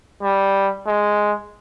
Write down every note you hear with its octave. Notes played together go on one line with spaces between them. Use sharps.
G3
G#3